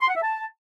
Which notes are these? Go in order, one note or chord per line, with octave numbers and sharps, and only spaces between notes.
C6
F#5
E5
A5